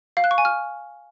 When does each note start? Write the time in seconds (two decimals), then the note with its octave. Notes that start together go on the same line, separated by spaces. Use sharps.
0.17 F5
0.24 F#6
0.31 C#6
0.38 G#5
0.45 F6